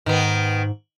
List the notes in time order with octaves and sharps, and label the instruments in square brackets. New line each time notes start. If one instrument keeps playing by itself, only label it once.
[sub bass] G#2 [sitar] D#3 B3